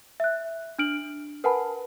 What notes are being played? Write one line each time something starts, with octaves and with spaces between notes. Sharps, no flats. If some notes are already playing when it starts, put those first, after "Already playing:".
E5 F#6
D4 F6 D7 F#7
A#4 B4 F#5 G#5 A5 B5